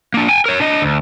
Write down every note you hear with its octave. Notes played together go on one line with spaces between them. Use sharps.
A#3 D4
G5 G#5
A#4 C#5
D4 D#5
D2